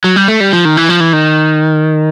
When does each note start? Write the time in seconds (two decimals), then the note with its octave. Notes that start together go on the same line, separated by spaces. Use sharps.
0.04 F#3
0.16 G3
0.28 A3
0.40 G3
0.53 F3
0.65 D#3
0.77 E3
0.89 F3
1.00 E3
1.13 D#3